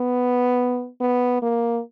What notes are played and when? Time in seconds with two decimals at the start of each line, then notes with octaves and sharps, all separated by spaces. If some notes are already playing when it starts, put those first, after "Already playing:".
Already playing: B3
1.01 B3
1.42 A#3